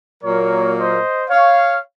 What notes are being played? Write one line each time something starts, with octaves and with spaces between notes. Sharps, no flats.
A#2 F#3 A#3 A#4 C#5
C5 D#5
C#5 F5